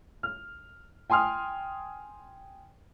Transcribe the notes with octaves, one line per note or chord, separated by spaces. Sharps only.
F6
G5 G#5 C6 D#6 F6